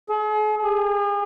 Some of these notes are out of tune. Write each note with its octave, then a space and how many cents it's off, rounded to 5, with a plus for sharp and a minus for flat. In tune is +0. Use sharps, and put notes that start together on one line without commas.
G#4 +45
G#4 -40